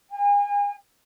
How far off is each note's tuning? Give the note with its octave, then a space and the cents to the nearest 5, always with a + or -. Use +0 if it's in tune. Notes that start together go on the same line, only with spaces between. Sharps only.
G#5 -35